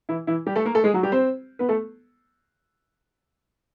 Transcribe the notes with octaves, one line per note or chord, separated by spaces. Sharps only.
E3 E4
E3 E4
G3 G4
A3 A4
A#3 A#4
A3 A4
G#3 G#4
F#3 F#4
G3 G4
C4 C5
B3 B4
A3 A4